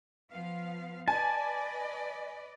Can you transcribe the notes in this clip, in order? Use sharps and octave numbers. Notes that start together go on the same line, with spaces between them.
F3 B3 F5
B4 D5 D#5 G#5 A5